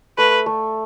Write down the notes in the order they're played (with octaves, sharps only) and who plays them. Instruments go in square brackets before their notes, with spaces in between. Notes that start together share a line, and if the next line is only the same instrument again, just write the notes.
[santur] A3 [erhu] B4
[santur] A3